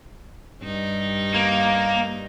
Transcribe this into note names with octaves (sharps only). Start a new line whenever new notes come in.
G2 G3 D#4
A#3